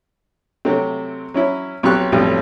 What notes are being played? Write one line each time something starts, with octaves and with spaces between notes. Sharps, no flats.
C3 F#3 A3 C4
F#3 C#4 E4
B1 F#3 C4 G4 C#6 F#6
B1 F2 A2 F3 G3